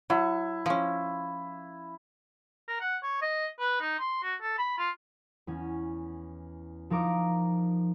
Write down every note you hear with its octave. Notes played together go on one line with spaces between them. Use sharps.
F#3 E4
F3 C#4
A#4
F#5
C#5
D#5
B4
D#4
C6
F#4
A4
B5
F4
E2 C#4
F3 D#4 A#4 D6